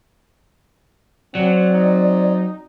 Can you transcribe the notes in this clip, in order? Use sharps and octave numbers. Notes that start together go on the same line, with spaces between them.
F#3 C4 D5 F#5
D#4